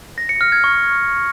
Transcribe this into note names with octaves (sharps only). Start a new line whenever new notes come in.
A#6
C#7
F6
G#6
C#6